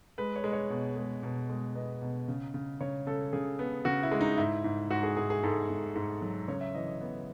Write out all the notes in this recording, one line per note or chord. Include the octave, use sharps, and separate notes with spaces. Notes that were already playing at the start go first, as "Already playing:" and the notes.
G#3 B4
C#5
G#3
C#5
B2
G#3
B2
G#3
B3 D#5
B2
C#3
C#3
C#3 C#5
C#3 A4
C#3 G#4
B3
C#3 F#4
E4
G#3
D#4
G#2 E4
G#2
G#2 F#4
G#4
G#2 G#4
G#4
G#2 A4
G#2
G#2 G#4
F#3
C#3 C#5
E5
E3 D#5
D#5
B3